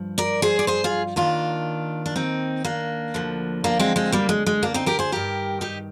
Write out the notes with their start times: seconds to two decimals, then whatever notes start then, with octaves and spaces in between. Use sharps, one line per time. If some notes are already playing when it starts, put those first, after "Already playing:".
Already playing: G2 F3
0.18 A#4 D5
0.42 G#4 C5
0.59 D5
0.67 G#4 C5
0.84 F4 G#4
1.16 D#2 D#3 D4 F4
2.06 D4
2.16 C4 D#4
2.65 A#3 D4
3.14 D2 D3 F3
3.64 A#3 D4
3.79 G#3 C4
3.96 G#3 C4
4.12 G3 A#3
4.29 G#3
4.46 G#3
4.63 A#3 D4
4.74 C4 D#4
4.86 G4 A#4
4.99 G#4 C5
5.12 G2 D#3 G4 A#4
5.61 D#4 G4